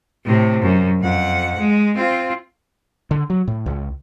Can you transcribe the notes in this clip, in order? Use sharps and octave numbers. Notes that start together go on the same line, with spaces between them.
A2 C3
F#2
F2 F#5
G#3
C4 F4
D3
F#3
A2
C#2